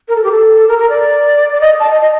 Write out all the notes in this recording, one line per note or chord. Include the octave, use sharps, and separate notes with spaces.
A#4
A4
G4
A4
A#4
A#4
D5
D5
D#5
A5
D#5
D#5